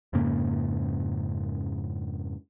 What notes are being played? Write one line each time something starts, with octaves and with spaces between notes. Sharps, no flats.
F2 G#2 C#3 A#3